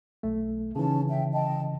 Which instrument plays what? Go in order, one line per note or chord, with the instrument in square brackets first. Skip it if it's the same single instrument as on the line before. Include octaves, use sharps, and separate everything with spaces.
[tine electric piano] B1 A3
[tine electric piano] C#3 E3 [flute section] C#4 D#4 A5
[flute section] E5 G5
D#5 G5 A5